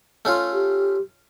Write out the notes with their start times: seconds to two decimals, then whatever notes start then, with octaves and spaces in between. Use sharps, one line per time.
0.25 A3 C#4 F4
0.53 G4